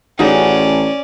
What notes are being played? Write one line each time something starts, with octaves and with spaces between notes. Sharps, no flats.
A1 C#4 D#4 F#4 G#4 D5